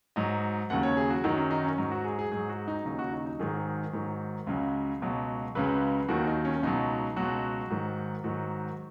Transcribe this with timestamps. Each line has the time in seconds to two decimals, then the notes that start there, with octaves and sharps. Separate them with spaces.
0.16 G#2 F#3 D#5
0.70 D#2 C#3 F#3 F#5
0.83 C#5
0.97 G#4
1.10 F#4
1.24 F#2 D#3 F#3 D#4
1.38 C#4
1.51 D#4
1.64 C#4
1.78 G#2 F#3 D#4
1.92 F#4
2.04 G#4
2.19 G#4
2.32 G#2 F#3 G#4
2.49 F#4
2.68 D#4
2.85 D#2 C#3 F#3 D#4
2.99 F#4
3.13 D#4
3.26 D#4
3.39 G#2 D#3 F#3 G#4
3.93 G#2 D#3 F#3
4.47 C#2 C#3 F#3
5.02 C#2 B2 F#3
5.55 C#2 C#3 F#3 B4
6.08 D#2 D#3 F#3 F#4
6.27 D#4
6.45 C#4
6.63 C#2 B2 F#3 D#4
7.16 C#2 B2 F#3 F#4
7.70 G#2 D#3 F#3
8.24 G#2 D#3 F#3 F#4